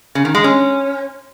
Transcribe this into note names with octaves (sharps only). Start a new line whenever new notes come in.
C#3
D#3
G#3
C#4